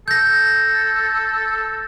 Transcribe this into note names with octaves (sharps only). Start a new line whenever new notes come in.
A4 G6 A#6